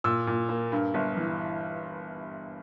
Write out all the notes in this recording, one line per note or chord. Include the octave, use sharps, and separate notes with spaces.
A#2 E6
A#2
A#3
G2
G1
E3